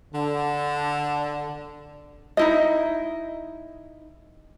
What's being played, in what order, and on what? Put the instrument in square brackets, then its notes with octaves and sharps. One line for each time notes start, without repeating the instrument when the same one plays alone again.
[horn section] D3
[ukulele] D#4 E4 D#5